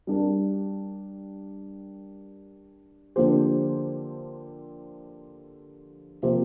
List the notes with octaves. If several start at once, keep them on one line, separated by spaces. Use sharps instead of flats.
G3 D4 G4 A#4
D3 F3 A#3 G4 C5
C3 F3 A#3 G4 C5